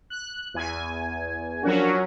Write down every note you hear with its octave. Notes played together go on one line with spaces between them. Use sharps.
F#6
E2 G#5
F3 F#3 C#4 D4 F#4 A#4